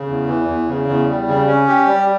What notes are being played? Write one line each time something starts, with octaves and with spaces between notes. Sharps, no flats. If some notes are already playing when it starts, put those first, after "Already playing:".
Already playing: C#3
E2
E3
E2
C#3
E2
G3
C#3
C#4
G4
G3